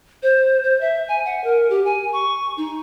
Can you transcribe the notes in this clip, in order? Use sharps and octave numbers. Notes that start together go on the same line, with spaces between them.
C5
C5
E5
G#5
F#5
A#4
G4
G#5
C#6
D#4